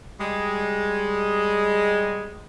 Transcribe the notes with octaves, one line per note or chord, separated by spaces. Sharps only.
G3 G#3